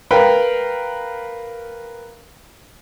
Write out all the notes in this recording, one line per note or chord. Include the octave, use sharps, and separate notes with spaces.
A#4 B4 F5 G5 B5